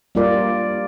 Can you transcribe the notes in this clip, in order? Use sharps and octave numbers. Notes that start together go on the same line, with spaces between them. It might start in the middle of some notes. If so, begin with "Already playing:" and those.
G3 A#3 F4 A#4 D5